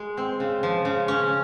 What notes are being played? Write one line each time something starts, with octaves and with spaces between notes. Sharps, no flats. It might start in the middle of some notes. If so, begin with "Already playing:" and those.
Already playing: G#3
C4
C#3
F3
C#3
C#4